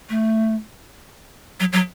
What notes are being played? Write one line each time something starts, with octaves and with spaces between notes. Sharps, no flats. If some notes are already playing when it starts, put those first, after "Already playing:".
A3
F#3
F#3